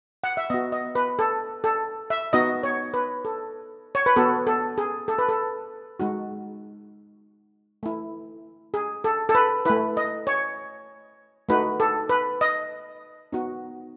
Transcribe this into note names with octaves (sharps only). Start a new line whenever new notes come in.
F#5
E5
B3 F#4 D#5
D#5
B4
A4
A4
E5
B3 D#4 F#4 D#5
C#5
B4
A4
C#5
B4
B3 F#4 A4
A4
G#4
A4
B4
A4
G#3 D#4 F#4
A3 E4
G#4
A4
A4
B4
A3 E4 B4
D#5
C#5
A3 D#4 F#4 B4
A4
B4
D#5
B3 D#4 F#4